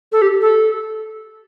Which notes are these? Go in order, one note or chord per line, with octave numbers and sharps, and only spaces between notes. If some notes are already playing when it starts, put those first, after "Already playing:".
A4
G4
A4